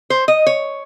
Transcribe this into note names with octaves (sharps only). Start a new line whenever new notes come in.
C5
D#5
C#5